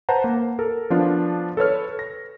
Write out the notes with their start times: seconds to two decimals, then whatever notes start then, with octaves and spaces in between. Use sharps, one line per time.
0.09 B4 C5 F#5 A5 A#5
0.24 A#3
0.59 A4 A#4
0.90 F3 B3 D4 F4
1.57 A4 B4 C#5 F6
1.99 A#6